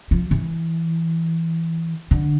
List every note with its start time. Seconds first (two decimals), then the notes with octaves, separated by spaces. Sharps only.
0.11 F3
0.31 E3
2.11 D3